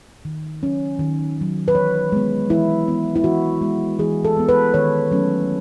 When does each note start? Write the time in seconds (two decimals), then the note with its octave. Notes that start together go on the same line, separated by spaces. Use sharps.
0.25 D#3
0.63 F#3 C#4
0.99 D#3
1.38 F#3 C#4
1.68 B4
1.75 E3 C#5
2.12 G#3 B3
2.50 E3 E4
2.87 G#3 B3
3.15 E4
3.24 E3 F#4
3.62 G#3 B3
3.99 E3 G#4
4.25 A4
4.37 G#3 B3
4.49 B4
4.74 D#3 C#5
5.11 F#3 A3 C#4